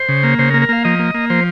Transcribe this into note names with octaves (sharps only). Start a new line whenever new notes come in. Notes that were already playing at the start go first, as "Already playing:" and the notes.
Already playing: C5
C#3
A#3
C#3 C5
A#4
A#3
A#4
A#3 F5
F3 D#5
A#3
A#3
F3 C5